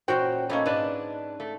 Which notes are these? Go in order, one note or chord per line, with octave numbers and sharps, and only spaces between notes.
A#2 E3 C#4 F#4 C5 G5
A3 A#3 C#4 D#4 E4
G#2 D4 B4 D5
A3